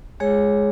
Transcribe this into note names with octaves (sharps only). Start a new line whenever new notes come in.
G#3 G#4 C#5